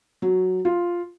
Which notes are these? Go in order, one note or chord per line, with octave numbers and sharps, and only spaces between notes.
F#3
F4